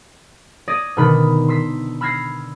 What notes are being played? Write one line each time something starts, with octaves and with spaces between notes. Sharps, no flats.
D5 D#6 G#6 A#6 D#7
B2 D3 D#3 B5
C6 E6 B6
B5 E6 F6 G#6 A#6 C7